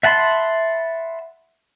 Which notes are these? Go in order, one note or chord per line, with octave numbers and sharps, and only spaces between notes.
E5 F#5 A5 B5 C6